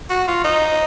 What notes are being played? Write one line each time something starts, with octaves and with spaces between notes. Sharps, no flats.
F#4
F4
D#4